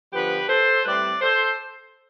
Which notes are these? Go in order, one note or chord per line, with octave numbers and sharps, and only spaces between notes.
D3 F3 B3 G4 B4
A4 C5
A2 G3 C4 B4 D5
A4 C5